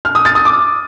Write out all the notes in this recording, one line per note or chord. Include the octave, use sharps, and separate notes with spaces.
F6
D#6
A6
D#6
D6